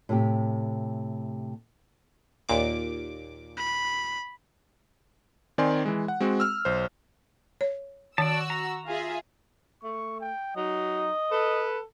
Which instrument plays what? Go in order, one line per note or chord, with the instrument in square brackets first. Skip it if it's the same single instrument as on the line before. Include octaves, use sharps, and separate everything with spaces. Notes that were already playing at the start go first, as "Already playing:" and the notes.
[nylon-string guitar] A2 C3 G4
[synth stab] D#2 A#2 D6
[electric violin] B5
[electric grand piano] D#3 C4 D5 G#5 C6
E3 G#3
F#5
G#3 C4 F#4
E6 F6
B1 C5
[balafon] C#5
[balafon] D#3 [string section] F#4 E6 [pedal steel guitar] D5 A5
[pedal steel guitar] A#5
[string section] F4 G#4 E5
[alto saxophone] A3 [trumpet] C#6
[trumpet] G5
[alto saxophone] F#3 [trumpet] D#4 [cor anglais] D#5
[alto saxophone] A4 [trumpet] B4